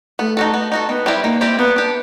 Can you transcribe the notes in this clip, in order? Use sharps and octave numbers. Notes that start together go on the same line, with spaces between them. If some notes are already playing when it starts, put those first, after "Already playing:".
A3 B3
D#4 F#4 A4
B3
D#4 F#4 A4
D#3 B3
G3 C4 E4 G4
D#3 A#3
G3 C4 E4 G4
A#3 B3
D4 G4